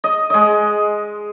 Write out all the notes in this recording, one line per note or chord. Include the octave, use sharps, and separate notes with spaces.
D#5
G#3 D#5